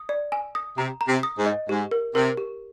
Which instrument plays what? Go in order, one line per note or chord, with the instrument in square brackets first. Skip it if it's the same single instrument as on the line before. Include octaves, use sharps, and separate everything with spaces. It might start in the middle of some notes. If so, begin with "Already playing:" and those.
Already playing: [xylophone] D#6
D5
G#5
D#6
[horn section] C3 [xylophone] A#5
[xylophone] A#5
[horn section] C3
[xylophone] D#6
[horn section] G#2
[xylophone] D#5
[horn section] G#2 [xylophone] G4
[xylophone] A#4
[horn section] C3 [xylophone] A#4
[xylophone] G4